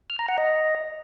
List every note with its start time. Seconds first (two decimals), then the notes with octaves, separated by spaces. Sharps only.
0.10 F6
0.19 A#5
0.28 F#5
0.38 D#5